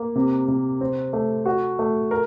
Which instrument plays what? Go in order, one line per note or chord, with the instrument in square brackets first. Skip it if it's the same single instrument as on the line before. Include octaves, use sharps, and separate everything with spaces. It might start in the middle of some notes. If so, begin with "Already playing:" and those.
Already playing: [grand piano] A#3
C3
C3
C4
A3
F#4
A3
A#4